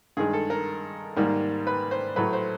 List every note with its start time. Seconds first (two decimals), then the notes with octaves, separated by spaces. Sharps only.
0.17 G2 D#3 G#3 G#4
0.33 A4
0.50 A#4
1.16 G#2 D#3 G3 A#3
1.67 B4
1.91 C5
2.16 A2 F#3 A3 B4
2.33 C5